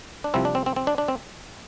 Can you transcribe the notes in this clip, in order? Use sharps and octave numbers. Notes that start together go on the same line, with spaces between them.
D4
C2 C3 F3 C4 E4
D4
C4
C4
C4
D4
D4
C4